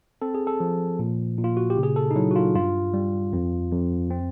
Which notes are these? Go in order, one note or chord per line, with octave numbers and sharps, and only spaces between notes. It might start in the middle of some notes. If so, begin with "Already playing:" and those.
C4 A4
G#4
A4
F3
A#2
A#2
F4
F#4
G4
C#3
G#4
A4
D#4
F#3 E4
F#4
F4
G2 F4
G3
F2
F2
C4